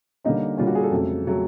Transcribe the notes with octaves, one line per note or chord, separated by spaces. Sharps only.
D3 G3 A#3 C#4 D#4
D3 G3 A#3 C#4 F4
F#4
G#4
A4
F2 C#3 F#3 A3
C#3 F#3 A3